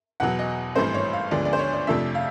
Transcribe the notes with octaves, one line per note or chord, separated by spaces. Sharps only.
E2 B2 F#3 F#5
D#5
G#1 G2 E3 A3 C4 C5
C#5
F5
D2 D3 F3 G#3 B3 D5
D5
C5
C#5
D5
F2 C3 F3 A3 D4 E5
F5